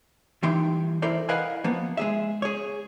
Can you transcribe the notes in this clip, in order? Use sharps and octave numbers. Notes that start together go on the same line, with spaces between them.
G2 A#2 E3 D#4 G5 C6
E4 A4 A#4 C5 D5
A#4 B4 D#5 F5 F#5 G#5
F3 A#3 B3
G#3 G#4 E5
G#4 C#5